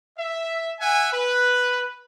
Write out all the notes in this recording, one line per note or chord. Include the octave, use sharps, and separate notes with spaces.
E5
E5 F#5 G#5
B4